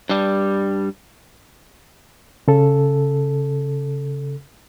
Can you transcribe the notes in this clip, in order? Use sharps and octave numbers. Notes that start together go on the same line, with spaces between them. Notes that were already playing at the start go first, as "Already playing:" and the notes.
G2 G3
C#3 A4